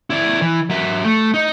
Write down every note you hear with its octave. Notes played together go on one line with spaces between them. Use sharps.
E4 D5
E3
F#3 E5
A3
D#4